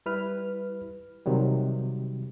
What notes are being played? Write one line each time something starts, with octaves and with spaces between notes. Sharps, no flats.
G3 E4 B4 F6
C3 D#3 F#3 G3